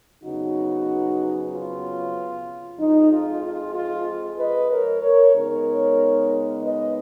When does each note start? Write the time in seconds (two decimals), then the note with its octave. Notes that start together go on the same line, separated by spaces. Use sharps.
0.22 F2 C#3 F#3 B3 D#4 F#4
1.50 F4
2.78 F2 F3 G#3 D#4
3.11 F4
3.42 F4
3.74 F4
4.39 B4 D#5
4.70 A#4 C#5
5.02 A#4 C#5
5.34 C#3 G#3 B3 D#4 A#4 C#5
6.63 B4 D#5